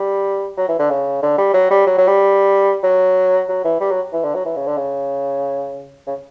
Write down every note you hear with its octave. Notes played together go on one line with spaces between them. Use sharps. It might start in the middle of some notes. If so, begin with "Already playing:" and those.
Already playing: G3
F#3
E3
D3
C#3
D3
G3
F#3
G3
F#3
F#3
G3
F#3
F#3
E3
G3
F#3
E3
D3
F#3
E3
C#3
D3
C#3
C#3